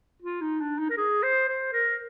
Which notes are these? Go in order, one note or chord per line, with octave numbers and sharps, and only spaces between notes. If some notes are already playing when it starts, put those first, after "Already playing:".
F4
D#4
D4
D#4
A#4
G#4
C5
C5
A#4